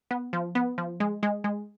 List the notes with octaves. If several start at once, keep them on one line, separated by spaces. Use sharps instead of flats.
B3
F3
B3
F3
G#3
G#3
G#3